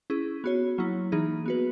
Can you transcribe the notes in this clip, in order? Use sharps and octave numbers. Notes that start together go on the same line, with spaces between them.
C#4 E4 G#4
B3 F#4 C#5
F#3 A#3 E4
E3 A#3 D#4 G#4
B3 F#4 B4